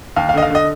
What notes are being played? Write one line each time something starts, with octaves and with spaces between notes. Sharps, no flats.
D#2 F5
F5
D3 D#5
F5
D3 D#5